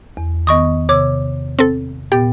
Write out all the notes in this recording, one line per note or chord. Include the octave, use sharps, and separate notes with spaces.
E2
D#3 B3 D#5 C#6 D#6
C3 C#5 D6 E6
C4 A4
A#2 B3 G4 G5 A6